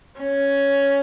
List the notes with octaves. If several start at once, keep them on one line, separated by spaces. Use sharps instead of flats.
C#4